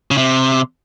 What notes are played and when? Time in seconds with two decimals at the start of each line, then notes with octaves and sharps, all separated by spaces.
0.11 C#3
0.17 C3